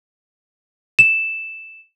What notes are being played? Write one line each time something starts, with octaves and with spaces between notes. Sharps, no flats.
E7